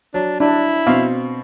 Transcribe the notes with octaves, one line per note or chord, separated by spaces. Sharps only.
F#3 D4
D4 E4
B2 C4 F5